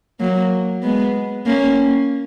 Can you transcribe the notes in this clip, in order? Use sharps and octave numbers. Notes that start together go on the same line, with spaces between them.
F#3 A#3
G#3 B3
A#3 C#4